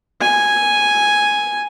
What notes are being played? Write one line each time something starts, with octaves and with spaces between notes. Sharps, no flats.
G#5